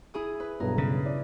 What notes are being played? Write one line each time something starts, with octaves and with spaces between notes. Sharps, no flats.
E4 G#4 D#6
B4
B1 G2 B3 A#4
C#3 B4
E4 D5